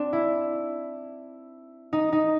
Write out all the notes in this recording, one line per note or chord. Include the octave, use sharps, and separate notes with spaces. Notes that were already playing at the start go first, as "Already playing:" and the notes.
Already playing: C4 D4
E4
D#4
D#4